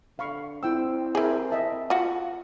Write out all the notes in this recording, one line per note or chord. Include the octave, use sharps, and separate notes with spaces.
D3 F5 B5 C#6
C4 E4 G5 E6
E4 G#4 A#4 C5
D#5 E5 A5
F4 F#4